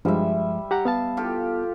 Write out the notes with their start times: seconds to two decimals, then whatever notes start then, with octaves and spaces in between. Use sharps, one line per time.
0.05 G2 F3 G3 G#3 E5
0.71 G4 F#5 A#5
0.85 B3 F5 A5
1.17 F4 G4 A4